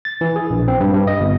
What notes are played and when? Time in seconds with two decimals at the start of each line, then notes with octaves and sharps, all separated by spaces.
0.05 A6
0.21 E3
0.36 G#4
0.50 A#1
0.68 C4
0.80 G2
0.93 G2
1.07 D#5
1.20 G1